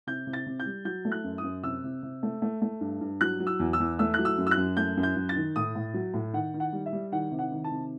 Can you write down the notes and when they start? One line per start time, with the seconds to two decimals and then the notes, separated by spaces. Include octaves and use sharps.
0.07 C3 G6
0.27 C3
0.33 A6
0.46 C3
0.60 G6
0.66 G3
0.85 F#3 G6
1.05 A3
1.12 F#6
1.24 F#2
1.38 D#6
1.44 F#2
1.63 C3 E6
1.84 C3
2.03 C3
2.23 A3
2.42 A3
2.62 A3
2.81 G2
3.01 G2
3.21 F#3 F#6
3.40 F#3
3.47 E6
3.60 E2
3.73 E6
3.80 E2
3.99 A3 E6
4.14 F#3 F#6
4.25 E6
4.38 F#2
4.47 E6
4.51 F#6
4.57 F#2
4.77 A3 G6
4.97 F#2
5.03 G6
5.16 F#2
5.29 A6
5.36 D#3
5.56 A2 D#6
5.75 A2
5.94 F#3
6.14 A2
6.33 D#3 F#5
6.54 D#3
6.60 F#5
6.73 G3
6.86 E5
6.93 G3
7.12 D#3 F#5
7.32 C3
7.39 F#5
7.52 D#3
7.64 A5
7.71 C3